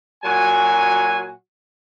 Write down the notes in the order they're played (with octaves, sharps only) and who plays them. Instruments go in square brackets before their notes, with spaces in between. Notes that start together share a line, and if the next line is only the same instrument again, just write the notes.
[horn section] A#2 F#3 F#4 G#5